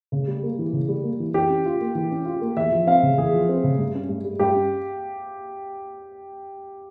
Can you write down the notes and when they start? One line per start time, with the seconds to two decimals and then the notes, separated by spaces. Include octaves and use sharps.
0.12 C#3
0.27 G3
0.43 A#3
0.59 E3
0.73 C#3
0.88 G3
1.03 A#3
1.20 E3
1.34 E3 G4
1.49 C#4
1.66 F4
1.81 A#3
1.95 E3
2.11 C#4
2.25 F4
2.41 A#3
2.57 E2 E5
2.71 F3
2.87 C4 F5
3.03 C#3
3.18 E2 G#4
3.33 F3
3.49 C4
3.64 C#3
3.78 G2
3.95 C#4
4.09 G2
4.24 G3
4.39 G2 G4
4.55 C#4